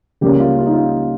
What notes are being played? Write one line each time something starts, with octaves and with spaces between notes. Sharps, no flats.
C#2 C#3 G3 A#3 C#4 G4
F4
F4
D#4
F4